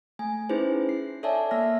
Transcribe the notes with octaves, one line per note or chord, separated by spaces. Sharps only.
A3 G#5
C#4 D#4 E4 G#4 B4 C5
C7
A4 C#5 D5 E5 G#5 A5
A#3 E5 F6 A#6